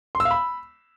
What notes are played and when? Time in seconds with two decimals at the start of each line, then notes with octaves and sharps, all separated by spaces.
0.15 C6
0.20 E6
0.25 F5
0.31 B5